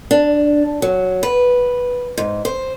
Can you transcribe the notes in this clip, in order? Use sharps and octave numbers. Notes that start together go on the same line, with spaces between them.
D4
F#3
B4
G#2
C5